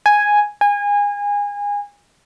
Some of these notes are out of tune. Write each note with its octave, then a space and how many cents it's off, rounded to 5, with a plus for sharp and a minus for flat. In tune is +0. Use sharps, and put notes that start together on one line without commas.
G#5 +0
G#5 -25